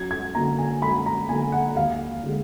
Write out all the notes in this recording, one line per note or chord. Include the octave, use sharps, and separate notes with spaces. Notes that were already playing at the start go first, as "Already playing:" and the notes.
Already playing: F#2 G#6
G#6
D3 F#3 A#3 A#5
G#5
F#2 B5
A#5
D3 F#3 A#3 G#5
F#5
D#2 F5
D3 G#3